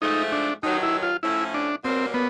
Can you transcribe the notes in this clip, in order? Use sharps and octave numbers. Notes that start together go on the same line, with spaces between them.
G#2 F3 A3 D#4
D4
G2 D#3 F#3 D#4
E4
F4
A2 F3 A3 C#4 E4
D4
B2 G3 A#3 C4 C#4
B3